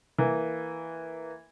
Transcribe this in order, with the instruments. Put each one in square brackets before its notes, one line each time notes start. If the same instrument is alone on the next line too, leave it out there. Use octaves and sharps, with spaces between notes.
[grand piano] E3 A#3